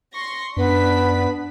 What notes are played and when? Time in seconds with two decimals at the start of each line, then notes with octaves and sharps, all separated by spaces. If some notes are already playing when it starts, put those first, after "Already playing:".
0.13 C6 C#6 A#6
0.57 F#2 B3 D4 B4 B6